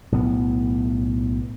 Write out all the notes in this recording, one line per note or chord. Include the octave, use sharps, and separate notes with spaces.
B1 A2 B3